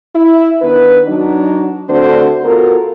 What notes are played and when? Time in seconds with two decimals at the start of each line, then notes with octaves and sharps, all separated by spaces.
0.16 E4
0.62 D#3 B3 D4 B4
1.07 F#3 D4 D#4
1.90 D3 A3 C4 D4 F#4 C5
2.45 B3 F4 F#4 A4 A#4